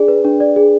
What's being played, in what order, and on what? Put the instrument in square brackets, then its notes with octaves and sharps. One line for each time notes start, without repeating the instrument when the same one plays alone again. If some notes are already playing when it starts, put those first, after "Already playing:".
Already playing: [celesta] D4 G#4 D5
B4
D4
D5
G#4